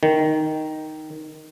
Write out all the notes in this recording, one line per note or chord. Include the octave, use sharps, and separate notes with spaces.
D#3